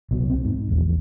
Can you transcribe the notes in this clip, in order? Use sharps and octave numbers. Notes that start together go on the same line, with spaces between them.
C2 B2 F#3
C4
G#2
E1 A#1 E2